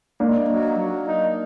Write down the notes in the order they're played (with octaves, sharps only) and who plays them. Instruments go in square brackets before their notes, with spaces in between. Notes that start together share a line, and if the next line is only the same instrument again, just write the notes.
[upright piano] A#3 D4 [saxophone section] D#4
[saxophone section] F#3
F#3
D#4